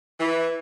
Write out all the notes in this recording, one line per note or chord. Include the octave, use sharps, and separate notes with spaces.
E3